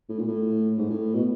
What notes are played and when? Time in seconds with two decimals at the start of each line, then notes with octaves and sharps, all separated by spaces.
0.09 A2
0.19 A#2
0.28 A2
0.78 G#2
0.90 A2
1.15 B2